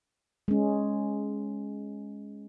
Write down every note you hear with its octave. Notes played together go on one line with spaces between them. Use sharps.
G#3 C#4